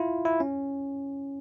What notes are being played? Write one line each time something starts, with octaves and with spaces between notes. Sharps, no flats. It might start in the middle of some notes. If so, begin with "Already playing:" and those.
Already playing: E4 F4
E4
C#4